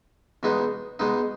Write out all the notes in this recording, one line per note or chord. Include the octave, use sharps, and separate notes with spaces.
E2 B2 G#3 B3 D#4
B2 G#3 B3 D#4